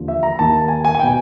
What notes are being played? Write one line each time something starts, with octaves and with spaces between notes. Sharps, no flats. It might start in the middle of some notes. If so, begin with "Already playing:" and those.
Already playing: D#2 D3 F3
E5
A#5
D#2 D#3 A5
G#5
G#5
G#5
B2 G5